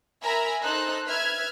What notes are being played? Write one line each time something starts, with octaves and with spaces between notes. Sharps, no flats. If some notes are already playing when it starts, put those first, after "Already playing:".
A#4 E5 G#5 A#5 B5
D#4 A4 C5 F#6
B4 E5 F6 G#6